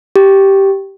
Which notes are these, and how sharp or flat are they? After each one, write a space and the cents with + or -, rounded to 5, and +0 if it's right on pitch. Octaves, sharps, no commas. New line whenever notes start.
G4 -5